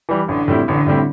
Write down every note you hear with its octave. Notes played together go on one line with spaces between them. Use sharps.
E3 G3
A1 D3
A2 G3 C4 E4
A1 D3
A2 G3 C4 E4